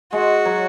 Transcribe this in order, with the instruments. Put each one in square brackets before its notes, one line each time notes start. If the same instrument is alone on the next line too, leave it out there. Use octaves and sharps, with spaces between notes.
[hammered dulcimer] G#3 [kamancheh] F#4
[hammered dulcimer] F#3